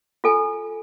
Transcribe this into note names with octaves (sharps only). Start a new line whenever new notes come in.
F4 A4 G#5